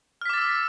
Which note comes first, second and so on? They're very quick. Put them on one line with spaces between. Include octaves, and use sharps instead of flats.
F6 B6 D6 A6 E6